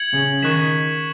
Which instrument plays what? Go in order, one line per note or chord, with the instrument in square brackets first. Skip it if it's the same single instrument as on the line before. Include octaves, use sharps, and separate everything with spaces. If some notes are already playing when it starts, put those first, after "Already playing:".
Already playing: [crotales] G#6 C#7 F#7
[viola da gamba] C#3
[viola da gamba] D#3 [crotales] C#6 F#6 B6 E7